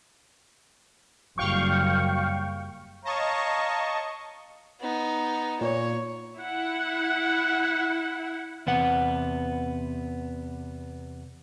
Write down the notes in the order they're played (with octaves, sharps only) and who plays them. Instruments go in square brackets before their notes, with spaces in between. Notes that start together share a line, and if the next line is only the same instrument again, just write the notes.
[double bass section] F#1 F#2 G3 [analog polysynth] F5 G5 C#6
[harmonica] C#5 F5 A#5 [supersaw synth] D#5 A5 C#6
[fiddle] B3 D#4
[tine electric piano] A#2 [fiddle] C#5
[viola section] E4 F#5
[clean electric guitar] E2 C3 B3 F#5